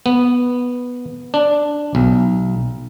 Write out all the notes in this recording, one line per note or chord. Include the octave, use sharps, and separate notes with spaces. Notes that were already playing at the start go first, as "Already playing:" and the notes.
B3
D4
B1